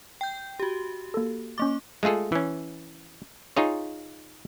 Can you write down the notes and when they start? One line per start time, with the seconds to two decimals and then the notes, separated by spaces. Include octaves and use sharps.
0.21 G5 G6
0.59 F#4 G4
1.14 A#3 A4
1.58 A#3 C#4 C#6 D6 A6
2.03 G#3 A3 F4 G#4 A4
2.32 E3 C#4
3.57 D#4 F4 G#4 C#5